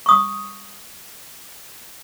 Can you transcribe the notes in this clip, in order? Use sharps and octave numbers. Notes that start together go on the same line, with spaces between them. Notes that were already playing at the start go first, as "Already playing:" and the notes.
C#6 D#6